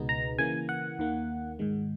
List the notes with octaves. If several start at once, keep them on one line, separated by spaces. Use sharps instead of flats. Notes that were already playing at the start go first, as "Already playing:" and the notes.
Already playing: C#2 B2 G#3 B3 D#4
A#5
C#3 E3 A#3 G#5
F#5
D#2 D#3 A#3
G#2 D#3 G#3